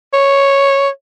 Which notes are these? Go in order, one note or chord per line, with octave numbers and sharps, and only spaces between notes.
C#5